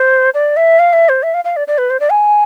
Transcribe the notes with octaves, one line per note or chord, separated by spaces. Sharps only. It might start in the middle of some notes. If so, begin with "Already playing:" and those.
Already playing: C5
D5
E5
F5
E5
C5
E5
F5
F5
D5
D5
B4
C5
D5
G#5